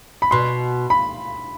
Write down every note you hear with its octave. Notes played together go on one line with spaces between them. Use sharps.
B5
B2 C6
B5